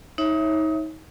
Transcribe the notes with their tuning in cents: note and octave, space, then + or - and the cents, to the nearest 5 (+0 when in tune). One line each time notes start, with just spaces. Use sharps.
D#4 +25 C#5 -15 E5 +0